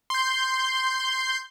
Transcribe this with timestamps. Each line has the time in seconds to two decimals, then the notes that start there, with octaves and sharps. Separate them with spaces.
0.10 C6 G6